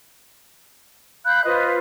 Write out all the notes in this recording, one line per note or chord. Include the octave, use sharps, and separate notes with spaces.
F5 B5 F#6 G6
F4 B4 C5 D#5